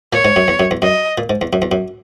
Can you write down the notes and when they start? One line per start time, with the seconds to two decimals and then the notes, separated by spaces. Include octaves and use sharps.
0.13 A#2 C#5
0.25 G#2
0.36 F#2
0.48 E2
0.60 F#2
0.71 E2
0.82 F#2 D#5
1.18 A#2
1.30 G#2
1.41 E2
1.53 F#2
1.62 E2
1.71 F#2